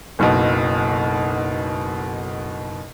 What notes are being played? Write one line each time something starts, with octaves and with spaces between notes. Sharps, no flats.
F#1 B1 B2